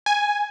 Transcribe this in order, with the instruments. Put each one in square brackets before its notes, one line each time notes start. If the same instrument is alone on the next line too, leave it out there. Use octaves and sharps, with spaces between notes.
[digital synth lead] G#5